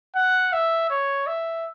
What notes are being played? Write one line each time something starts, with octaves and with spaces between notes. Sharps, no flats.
F#5
E5
C#5
E5